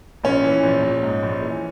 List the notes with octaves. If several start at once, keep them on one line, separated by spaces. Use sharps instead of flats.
A#1 C#4
E3
A#1
A#1
G#2
A#1
E3